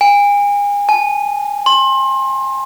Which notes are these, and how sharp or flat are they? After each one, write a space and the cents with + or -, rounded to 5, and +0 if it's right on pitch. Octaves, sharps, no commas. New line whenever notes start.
G#5 -35
G#5 +40
C6 +30